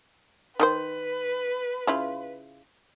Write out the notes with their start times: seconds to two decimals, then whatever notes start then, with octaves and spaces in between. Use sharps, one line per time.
0.60 D#3 D#4 B4 C5
1.87 C#3 E4 F4